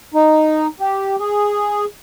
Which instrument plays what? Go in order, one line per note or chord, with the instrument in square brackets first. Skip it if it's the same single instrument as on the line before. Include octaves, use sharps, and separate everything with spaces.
[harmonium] D#4
G4
G#4